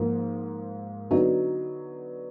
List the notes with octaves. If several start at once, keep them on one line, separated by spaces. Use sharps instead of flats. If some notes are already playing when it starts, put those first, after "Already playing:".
Already playing: G#2 F3 A#3
D3 F#3 B3 D#4